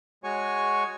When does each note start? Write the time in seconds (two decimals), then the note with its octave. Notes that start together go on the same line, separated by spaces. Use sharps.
0.24 G#3 F#4 C#5 G#5 C#6